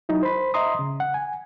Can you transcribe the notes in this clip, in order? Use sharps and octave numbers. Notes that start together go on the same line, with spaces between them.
F#3 D#4 E4
C5 B5
D#5 E5 A#5 C6 D#6
C#3
F#5
G#5